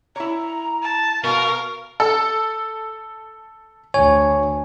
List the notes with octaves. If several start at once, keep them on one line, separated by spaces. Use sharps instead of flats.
E4 C#5 A#5
A5
B2 A#4 F5 C#6
A4
D2 C#5 G#5